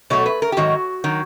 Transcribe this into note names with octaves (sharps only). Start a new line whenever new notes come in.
B2 F#3 A3 C#5
B4
A#4
G4
G#2 D#3 F#3 F#4
D#3 F#3